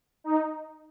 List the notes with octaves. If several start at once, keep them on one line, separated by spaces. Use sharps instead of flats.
D#4